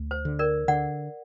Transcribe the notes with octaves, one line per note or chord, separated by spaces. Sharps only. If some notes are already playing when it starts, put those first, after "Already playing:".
Already playing: D2
C5
D3
A#4 D5
D3 D5 F#5